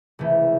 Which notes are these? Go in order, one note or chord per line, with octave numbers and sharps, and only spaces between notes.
C#2 C3 E3 A3